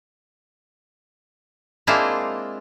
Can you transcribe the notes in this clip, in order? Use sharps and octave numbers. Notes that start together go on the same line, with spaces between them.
G#3 A#3 C4 D4 E4 F4